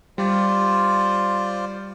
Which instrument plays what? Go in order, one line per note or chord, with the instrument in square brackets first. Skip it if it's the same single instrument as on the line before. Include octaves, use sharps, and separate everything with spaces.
[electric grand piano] G3 [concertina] F4 C5 D5